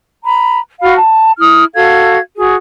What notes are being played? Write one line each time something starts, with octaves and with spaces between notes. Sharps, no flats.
A#5 B5
F#4 F5 B5 F6
A5
E4 D#6 F6
F#4 A4 F5 G#6
F#4 G#4